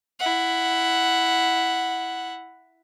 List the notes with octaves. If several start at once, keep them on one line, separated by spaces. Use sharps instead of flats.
E4 F#5